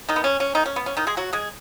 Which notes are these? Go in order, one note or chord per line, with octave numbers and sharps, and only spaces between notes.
D#3 D#4
B3
C#4
C#4
D#3 D#4
C#4
B3
C#4
D#3 D#4
G#3 G#4
F#3 F#4
G#3 G#4